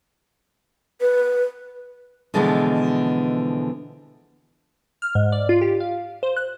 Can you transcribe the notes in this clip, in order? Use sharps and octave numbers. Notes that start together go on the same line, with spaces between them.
B4
B2 D3 E3 F3 G#3 B3
F6
G#2
D5
F4
G4
F5
C5
F#6